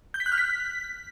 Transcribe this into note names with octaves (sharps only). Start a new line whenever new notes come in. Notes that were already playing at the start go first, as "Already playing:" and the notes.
G6
B6
F#6
F6
B6